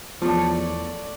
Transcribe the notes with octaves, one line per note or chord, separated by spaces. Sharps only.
E2 F3 A3 C#5 D5